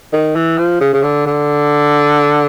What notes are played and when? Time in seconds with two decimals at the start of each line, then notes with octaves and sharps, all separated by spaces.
0.13 D#3
0.35 E3
0.58 F3
0.81 C#3
0.93 C#3
1.03 D3
1.26 D3